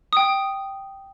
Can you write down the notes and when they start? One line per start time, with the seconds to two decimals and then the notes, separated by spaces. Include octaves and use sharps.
0.13 G5 D#6